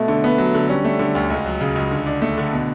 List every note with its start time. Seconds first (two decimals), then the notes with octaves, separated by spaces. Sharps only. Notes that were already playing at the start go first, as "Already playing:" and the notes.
Already playing: B2 A3
0.08 D3
0.24 B3
0.38 F#3
0.54 D3
0.69 G3 C#4
0.85 A3
0.99 D3
1.15 D2
1.30 C#2
1.46 F#3
1.61 C#3
1.75 C#2
1.91 D3
2.06 D4
2.22 A3
2.38 D3
2.53 B2